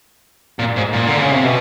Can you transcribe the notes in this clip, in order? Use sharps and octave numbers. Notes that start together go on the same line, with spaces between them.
A#2
G#2
A#2
D3
C#3
C3
B2